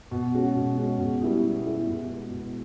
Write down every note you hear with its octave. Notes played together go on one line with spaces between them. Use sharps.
B2
G#3 C#4 F#4
B2
G#3 C#4 F#4
B2
G3 B3 E4 G#4
B2
G3 B3 E4 G#4
B2
G#3 B3
B2